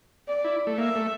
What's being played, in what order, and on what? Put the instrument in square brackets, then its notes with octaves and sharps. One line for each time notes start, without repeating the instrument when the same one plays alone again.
[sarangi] D5
[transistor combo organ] E4
A3
[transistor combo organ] A#3 [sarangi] E5
[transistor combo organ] A3